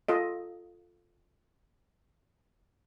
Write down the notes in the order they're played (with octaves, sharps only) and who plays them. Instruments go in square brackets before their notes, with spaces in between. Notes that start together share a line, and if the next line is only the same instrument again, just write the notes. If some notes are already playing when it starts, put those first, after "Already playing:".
[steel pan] F4 A4 D#5